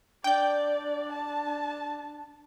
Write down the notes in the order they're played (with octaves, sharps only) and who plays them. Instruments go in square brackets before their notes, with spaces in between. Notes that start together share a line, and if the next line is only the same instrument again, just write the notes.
[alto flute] D4 [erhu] D5 [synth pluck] G5 G6
[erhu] A5